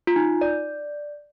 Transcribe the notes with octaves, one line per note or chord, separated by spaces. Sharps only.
F4
D#4
D5